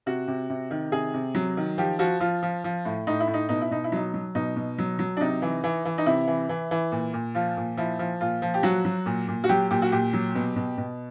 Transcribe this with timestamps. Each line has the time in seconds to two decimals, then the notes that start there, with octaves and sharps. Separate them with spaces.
0.06 C3 F#4
0.28 C3
0.50 C3
0.71 D#3
0.92 C3 G#4
1.14 C3
1.35 F#3
1.57 D#3
1.78 F3 G4
1.99 F3 F#4
2.20 F3 F4
2.43 F3
2.64 F3
2.85 A2
3.07 A2 D#4
3.20 E4
3.27 A2
3.34 D#4
3.49 B2 D#4
3.61 E4
3.71 B2 D#4
3.84 E4
3.92 F#3 D#4
4.14 F#3
4.35 B2 D#4
4.56 B2
4.78 F#3
4.99 F#3
5.17 D4
5.20 C3 D#4
5.42 E3
5.64 E3
5.85 E3
5.98 D#4
6.06 C3 E4
6.27 E3
6.49 E3
6.71 E3
6.92 A#2
7.13 A#2
7.35 F3 F4
7.57 A#2
7.77 F3 E4
7.99 F3
8.21 A#2 F4
8.42 F3
8.54 G4
8.63 F#3 F#4
8.85 F#3
9.06 A#2
9.28 A#2
9.44 F#4
9.49 F#3 G4
9.71 A#2 G4
9.82 F#4
9.92 A#2 G4
10.13 F#3
10.35 B2
10.56 B2
10.78 B2